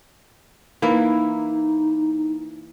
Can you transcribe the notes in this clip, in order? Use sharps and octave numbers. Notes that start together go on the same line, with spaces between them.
E3 A#3 D#4 E4